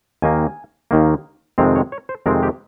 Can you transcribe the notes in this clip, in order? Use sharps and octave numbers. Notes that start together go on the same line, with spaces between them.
D#2 D#3 A#3 G#5
D#2 D#3 A#3
F2 C3 D#3 G#3 C4 F5
C#5
C#5
C5
F2 C3 D#3 G#3 C4 A#4
G4